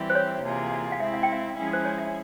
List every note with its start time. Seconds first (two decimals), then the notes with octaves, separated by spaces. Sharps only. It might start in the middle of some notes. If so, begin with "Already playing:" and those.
Already playing: E3 G3 C4 E4 G4
0.10 C5
0.15 C#5
0.43 C3 E3 A#3 F4 G#4
0.92 F5
0.99 G#3 C4 E4 E5
1.14 F5
1.23 G5
1.33 F5
1.56 F3 G#3 C#4 E4 G#4
1.73 C5
1.85 C#5
1.98 E5